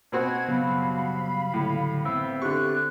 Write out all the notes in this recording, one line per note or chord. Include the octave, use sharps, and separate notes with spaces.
B2 C4 F#4 G#6
C#3 F#3 G3 B3 F5 B5
A2 D3
B3 C4 E4 E6
D3 G4 C#6 F#6